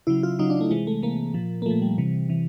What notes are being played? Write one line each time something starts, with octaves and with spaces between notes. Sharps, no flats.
C#3 F#3 E4
F4
C#3 F#3 D#4
D4
A3
C3 E3 G#3
A3
C3 E3 A#3
A#2 F3
A#3
A#2 F3 A3
G3
C3 E3
C3 E3